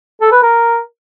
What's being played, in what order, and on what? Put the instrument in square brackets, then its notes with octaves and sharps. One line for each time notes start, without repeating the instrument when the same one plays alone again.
[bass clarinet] A4
B4
A#4